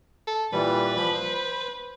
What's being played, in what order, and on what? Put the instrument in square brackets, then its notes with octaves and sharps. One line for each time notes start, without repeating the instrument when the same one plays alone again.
[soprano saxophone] A4
[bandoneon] A#2 E3 G3 [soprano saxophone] B4
[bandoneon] F3 B5
C5